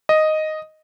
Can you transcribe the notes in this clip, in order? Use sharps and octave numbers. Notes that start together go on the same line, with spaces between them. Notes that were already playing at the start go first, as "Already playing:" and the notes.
D#5